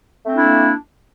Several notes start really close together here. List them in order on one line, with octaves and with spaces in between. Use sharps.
A3 C4 D4 E4 A#3